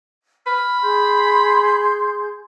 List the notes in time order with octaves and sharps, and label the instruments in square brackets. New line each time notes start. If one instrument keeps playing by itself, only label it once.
[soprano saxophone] B5 [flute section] F6
[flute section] G#4 C6 G6